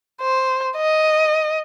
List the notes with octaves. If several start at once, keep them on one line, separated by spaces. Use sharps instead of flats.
C5
D#5